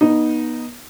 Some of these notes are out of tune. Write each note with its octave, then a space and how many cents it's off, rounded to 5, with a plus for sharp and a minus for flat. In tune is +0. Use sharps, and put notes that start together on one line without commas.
B3 -30 D#4 -10